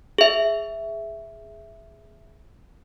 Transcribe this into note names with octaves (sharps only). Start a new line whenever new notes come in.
G#4 E5